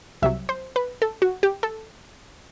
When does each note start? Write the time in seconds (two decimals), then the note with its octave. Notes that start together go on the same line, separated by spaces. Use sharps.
0.22 C2 C3 F#3 E5
0.49 C5
0.76 B4
1.02 A4
1.22 F#4
1.43 G4
1.63 A4